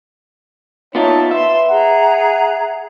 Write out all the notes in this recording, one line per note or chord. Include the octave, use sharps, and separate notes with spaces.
B3 D#4 F4 C#5 E5 A5
B4 E5 C6
G#4 F#5 A#5